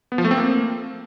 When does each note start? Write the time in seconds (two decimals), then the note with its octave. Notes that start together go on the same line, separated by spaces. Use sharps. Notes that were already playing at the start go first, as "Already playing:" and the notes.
0.12 B3
0.18 F3
0.24 A3
0.31 C4
0.37 A#3